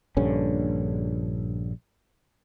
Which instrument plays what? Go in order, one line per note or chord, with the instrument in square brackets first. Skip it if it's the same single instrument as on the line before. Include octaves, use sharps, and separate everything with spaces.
[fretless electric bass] A#1 G2 D3 C#4